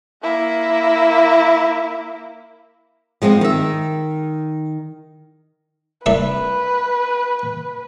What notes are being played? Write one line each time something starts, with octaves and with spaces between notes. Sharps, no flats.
A#3 E4
F3 G#3 B3 C4
D#3 E5
C2 B4 D5 E5